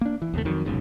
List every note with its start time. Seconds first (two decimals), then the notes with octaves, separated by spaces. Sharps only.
0.01 A#3 D4
0.22 E3
0.34 D#2 C3 A3
0.45 F2 D#3 F#3
0.65 F1 B1 G#2 C#3